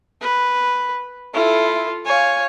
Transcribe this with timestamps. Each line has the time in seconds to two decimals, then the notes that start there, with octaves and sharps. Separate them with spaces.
0.21 B4
1.34 E4 F4 A4
2.06 C#5 F5 G#5